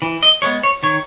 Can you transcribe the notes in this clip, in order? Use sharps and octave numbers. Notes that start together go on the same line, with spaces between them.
E3
D#5
G#3 B3 C#5
C#5
D#3 C#5